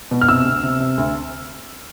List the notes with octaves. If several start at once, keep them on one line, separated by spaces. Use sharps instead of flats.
B2
F6
C3 E6
D2
C3
C3
D2